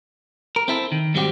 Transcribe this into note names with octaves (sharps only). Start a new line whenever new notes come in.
A#4
C4 E4 A4
D#3
G#2 D#3 G3 C4 F#4 G4